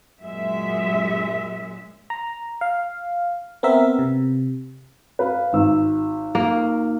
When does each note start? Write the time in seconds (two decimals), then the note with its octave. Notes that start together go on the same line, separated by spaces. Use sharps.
0.20 F#2 A#2 G#3 E5
2.10 A#5
2.61 F5
3.63 B3 C4 A#4 E5
3.99 C3
5.19 B4 F5
5.53 G#1 E6
6.35 A#3